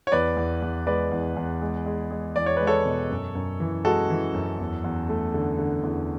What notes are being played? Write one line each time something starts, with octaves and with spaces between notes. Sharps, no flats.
C#5
E2 B4 D5
E2
E2
G#3 B4 D5
E2
E2
G#3
G#3
G#3
E2 D5
C#5
G#3 B4
A4 C#5
B2
F#2
F#2
E3
G#3 F#4 A4
E3
F#2
E2
E2
A3
D3
D3
E2